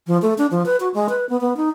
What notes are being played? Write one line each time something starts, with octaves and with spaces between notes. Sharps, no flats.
F3
A3
D4
F3
B4
F#4
G#3
B4
B3
B3
D#4